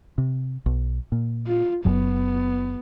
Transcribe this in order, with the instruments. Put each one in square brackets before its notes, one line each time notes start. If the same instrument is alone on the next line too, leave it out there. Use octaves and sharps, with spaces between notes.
[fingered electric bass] C3
B1
A#2
[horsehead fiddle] F4
[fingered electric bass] F#1 F#2 F#3 [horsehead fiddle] B3